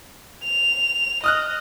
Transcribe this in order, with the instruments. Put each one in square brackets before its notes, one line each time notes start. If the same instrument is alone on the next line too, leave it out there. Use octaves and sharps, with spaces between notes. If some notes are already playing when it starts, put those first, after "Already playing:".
[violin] F7
[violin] D#5 [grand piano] D#6 F6 F#6